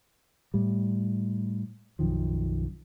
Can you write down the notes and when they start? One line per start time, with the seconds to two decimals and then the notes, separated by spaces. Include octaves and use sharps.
0.54 A2 G3
1.99 B1 F#2 D#3 F3